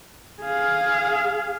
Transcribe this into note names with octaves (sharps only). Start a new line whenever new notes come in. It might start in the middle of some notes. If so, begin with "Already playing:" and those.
G#4 F5